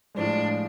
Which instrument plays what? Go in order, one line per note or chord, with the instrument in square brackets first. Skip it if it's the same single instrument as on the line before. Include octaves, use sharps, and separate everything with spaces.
[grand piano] A2 F3 G#3 [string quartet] D4